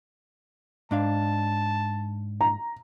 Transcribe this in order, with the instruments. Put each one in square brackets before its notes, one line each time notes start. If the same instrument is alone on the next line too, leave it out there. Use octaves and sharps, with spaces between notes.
[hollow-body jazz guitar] G#2 D4 F5 [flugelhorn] A5
[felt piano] A#5